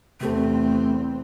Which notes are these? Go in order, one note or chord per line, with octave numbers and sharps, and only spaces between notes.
E2 C3 A3 C4 G4 A4